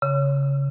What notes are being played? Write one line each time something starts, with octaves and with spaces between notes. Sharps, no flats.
C#3